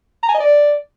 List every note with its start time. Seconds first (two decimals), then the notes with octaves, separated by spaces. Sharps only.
0.23 A#5
0.29 G#5
0.35 D#5
0.40 D5